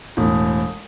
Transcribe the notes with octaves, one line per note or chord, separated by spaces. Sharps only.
E1 A2